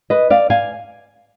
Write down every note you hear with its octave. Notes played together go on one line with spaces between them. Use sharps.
B4 D#5
D5 F5
F5 G#5